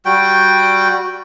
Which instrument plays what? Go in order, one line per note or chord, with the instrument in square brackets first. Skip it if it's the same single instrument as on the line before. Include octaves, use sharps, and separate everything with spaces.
[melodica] G3 F#4 G5